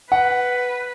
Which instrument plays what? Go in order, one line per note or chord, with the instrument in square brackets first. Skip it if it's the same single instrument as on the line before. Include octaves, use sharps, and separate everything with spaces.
[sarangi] B4 [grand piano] F#5